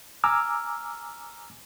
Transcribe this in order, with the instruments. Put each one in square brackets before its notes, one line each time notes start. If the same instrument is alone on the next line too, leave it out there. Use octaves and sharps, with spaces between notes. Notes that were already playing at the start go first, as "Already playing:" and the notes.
[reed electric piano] G#5 A#5 D6 E6 F6